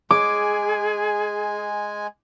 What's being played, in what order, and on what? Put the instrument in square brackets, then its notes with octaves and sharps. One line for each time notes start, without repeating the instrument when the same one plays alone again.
[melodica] G#3 G#5 [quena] G#4 [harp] D6